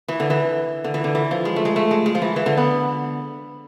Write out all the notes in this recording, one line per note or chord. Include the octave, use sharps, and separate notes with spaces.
E3
D3
E3
D3
E3
D3
E3
F3
G#3
A3
G#3
A3
G#3
G#3
F3
E3
E3
D3
B3